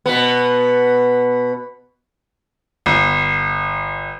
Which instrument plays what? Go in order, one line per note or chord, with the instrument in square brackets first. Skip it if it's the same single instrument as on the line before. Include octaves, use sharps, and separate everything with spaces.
[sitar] B2 B3
[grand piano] G1